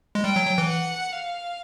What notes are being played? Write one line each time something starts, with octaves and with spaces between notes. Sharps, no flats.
G#3
G3 G5
F#3
F#3
E3
F#5
F5